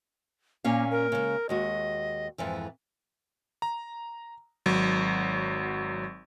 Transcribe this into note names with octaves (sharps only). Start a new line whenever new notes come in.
A#2 A#3 C#4 F5
A#4
C#3 G#3
D#2 G#3 F#4 D#5
F2 G#2 E3
A#5
G#1 F#3